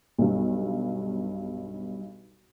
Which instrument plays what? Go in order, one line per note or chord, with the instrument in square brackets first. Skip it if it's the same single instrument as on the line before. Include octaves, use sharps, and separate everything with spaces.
[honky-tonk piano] B1 G2